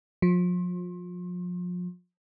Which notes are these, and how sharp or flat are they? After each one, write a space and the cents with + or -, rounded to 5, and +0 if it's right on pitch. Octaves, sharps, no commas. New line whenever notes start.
F3 +35